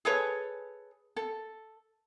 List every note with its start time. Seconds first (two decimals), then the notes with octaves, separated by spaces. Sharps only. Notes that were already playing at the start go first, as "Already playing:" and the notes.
0.05 G#4 A4 B4 C#5
1.16 A4